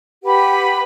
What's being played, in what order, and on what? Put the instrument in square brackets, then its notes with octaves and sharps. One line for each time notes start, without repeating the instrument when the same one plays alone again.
[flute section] G4 B4 F#5 B5